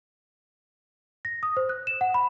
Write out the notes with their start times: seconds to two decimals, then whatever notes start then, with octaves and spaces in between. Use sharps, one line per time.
1.25 A#6
1.43 D#6
1.57 C5
1.69 F#6
1.87 E7
2.01 F#5
2.14 B5